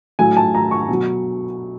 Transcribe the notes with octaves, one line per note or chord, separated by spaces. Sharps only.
A2 F#3 G#5
A5
A#5
C#6
B2 F#3